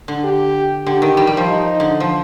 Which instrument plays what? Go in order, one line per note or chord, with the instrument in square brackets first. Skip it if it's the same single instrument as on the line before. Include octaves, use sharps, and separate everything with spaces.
[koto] D3
[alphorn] G4
[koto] D3 [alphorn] G4
[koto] D#3
G3
G3
F3
[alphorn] D#4
[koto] D3
F3